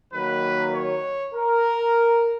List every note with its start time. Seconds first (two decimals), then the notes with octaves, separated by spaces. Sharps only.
0.12 D#3 F#3 A#3 B4
0.74 C#5
1.34 A#4